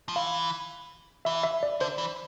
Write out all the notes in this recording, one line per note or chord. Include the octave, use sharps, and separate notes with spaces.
F3
E3 F5
E3 E5
E5
D5
D3 C5
E3